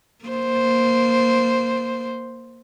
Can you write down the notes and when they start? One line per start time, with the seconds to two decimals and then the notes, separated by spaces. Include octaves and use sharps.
0.25 A#3 C5